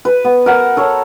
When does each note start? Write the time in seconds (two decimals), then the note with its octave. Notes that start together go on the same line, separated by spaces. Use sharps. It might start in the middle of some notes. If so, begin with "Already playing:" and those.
0.05 B4
0.25 B3
0.46 A#4 F#5
0.77 A4 C#5 F#5